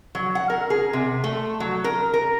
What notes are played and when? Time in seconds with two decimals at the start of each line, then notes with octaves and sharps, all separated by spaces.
0.15 F#3
0.35 F#5
0.50 A#4
0.70 G#4
0.93 C3
1.24 A3
1.60 F#3
1.84 A#4
2.14 A#4